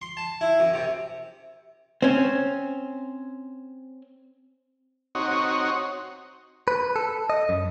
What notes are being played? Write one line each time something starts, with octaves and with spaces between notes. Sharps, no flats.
C6
A5
E4
F#2
C3
C4 C#4
C4 D#4 F#4 C#5
B4
A4
D#5
F#2